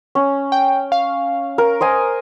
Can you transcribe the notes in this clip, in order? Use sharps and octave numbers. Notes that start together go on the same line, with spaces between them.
C#4
G5
F5
A#4
C5 D#5 G#5